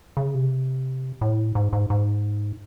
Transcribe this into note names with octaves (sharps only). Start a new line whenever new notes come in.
C#3
C3
A2
G#2
G#2
G#2